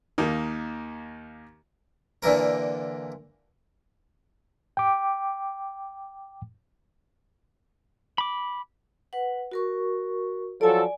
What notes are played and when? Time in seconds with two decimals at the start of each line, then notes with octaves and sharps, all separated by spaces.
0.18 D#2 A#3 D#4
2.23 A#2 D3 E3 A#4
4.77 G5 D6
8.18 B5 D6
9.13 B4 F#5
9.52 F#4 A#4 C#6
10.61 F3 F#3 A4 D5 G#5